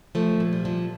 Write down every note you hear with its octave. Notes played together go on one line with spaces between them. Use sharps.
F3 A3
A#2
G3
F3